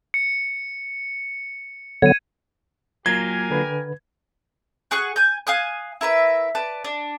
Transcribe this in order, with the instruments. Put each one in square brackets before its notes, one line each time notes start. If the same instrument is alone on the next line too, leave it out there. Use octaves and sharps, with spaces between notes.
[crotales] C#7
[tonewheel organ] D3 F#3 B3 [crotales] G#6 D#7
[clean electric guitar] F#3 A#3 F4 [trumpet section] G4 A#4 G#5 [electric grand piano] G#6
[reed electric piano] D3 B4
[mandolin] F#4 G#4 C#6 F#6
G#5 G6
F5 G#5 D#6 F#6
E4 A#4 B4 E5
B4 D5 A5
D4